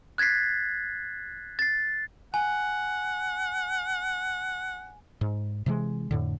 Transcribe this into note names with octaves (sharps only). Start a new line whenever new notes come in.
F#6 G#6 A6 B6 C7
A6 C7
F#5 G#5
G#2
C3 E3 F3 G#3
F2 A2 D3